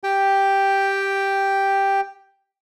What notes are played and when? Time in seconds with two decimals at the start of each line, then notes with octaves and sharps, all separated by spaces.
0.04 G4 G5